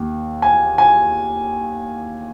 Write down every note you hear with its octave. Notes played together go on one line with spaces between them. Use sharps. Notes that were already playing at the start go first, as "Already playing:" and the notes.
Already playing: D#2
G#5
G#5